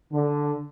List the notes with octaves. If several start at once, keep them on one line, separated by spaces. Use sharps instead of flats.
D3